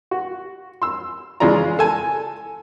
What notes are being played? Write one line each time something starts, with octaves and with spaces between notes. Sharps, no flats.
F#4
C6 E6
C#3 E3 G#3 F4 D5 A#5
A4 G#5 A5